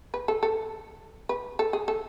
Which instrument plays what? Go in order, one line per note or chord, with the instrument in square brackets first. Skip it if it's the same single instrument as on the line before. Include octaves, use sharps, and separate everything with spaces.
[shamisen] B4
A4
A4
B4
A4
G#4
A4